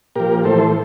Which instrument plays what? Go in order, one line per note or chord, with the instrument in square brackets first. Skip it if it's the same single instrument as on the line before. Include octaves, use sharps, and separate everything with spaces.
[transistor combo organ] A#2 F3 G4 A#4
A2 E3 A4 C5